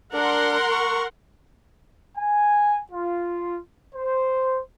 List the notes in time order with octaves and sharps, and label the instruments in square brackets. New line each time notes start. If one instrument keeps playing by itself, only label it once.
[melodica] D4 [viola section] A#4 F#5 C6
[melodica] C#6
[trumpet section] G#5
F4
C5